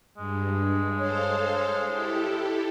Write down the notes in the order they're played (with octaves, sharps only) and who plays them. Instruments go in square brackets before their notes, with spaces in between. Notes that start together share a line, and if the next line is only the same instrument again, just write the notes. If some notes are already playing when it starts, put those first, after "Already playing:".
[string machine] G2 [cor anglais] G#3
[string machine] A4 C5 F5 [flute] C#5
[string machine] E4 G4 A4